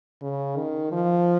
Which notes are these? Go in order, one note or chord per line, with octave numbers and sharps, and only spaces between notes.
C#3
D#3
F3